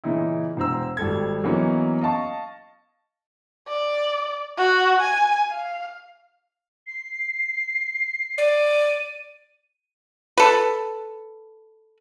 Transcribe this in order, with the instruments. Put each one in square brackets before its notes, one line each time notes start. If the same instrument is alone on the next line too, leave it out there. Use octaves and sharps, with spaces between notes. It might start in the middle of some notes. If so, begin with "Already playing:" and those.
[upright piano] A#2 C#3 E3 D#4 E4
E1 C5 A#5 E6
G#1 G3 A4 G#6
E3 F#3 A#3 B3 C#4 D#4
D#5 F5 A5 C#6
[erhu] D5
F#4
G#5
F5
[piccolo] C7
[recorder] D5 [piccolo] D#7
[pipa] A4 B4